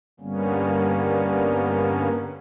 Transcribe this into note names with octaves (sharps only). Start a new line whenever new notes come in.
G2 D3 G3 A#3 B3 C#4